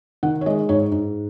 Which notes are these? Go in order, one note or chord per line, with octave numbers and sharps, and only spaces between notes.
D#3 F#5
C#5
G#3 D#5
G#2 C#5
G#2